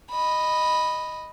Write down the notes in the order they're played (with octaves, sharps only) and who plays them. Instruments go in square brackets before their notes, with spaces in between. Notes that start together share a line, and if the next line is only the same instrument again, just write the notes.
[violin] D#5 B5